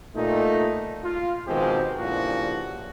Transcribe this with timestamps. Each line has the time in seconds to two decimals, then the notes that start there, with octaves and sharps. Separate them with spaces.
0.16 A#2 A3 D#4
1.04 F4
1.47 B2 D#3 F3 G#3 C4 G4
1.99 G2 A#2 C#3 F3 E4 F#4